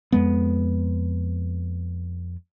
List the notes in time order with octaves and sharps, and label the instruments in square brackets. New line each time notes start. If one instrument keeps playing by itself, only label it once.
[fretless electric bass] F2 G#3 B3